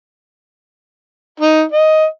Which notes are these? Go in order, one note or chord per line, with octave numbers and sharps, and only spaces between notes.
D#4
D#5